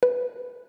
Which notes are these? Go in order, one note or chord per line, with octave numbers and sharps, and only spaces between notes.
B4